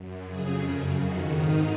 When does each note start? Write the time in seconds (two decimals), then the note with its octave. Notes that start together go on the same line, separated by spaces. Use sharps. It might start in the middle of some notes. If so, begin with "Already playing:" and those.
Already playing: F#2
0.26 F2 C#3 G#4
0.63 F#2 C#3
0.98 F2 D#3 F#4
1.34 G#2 D#3 D#4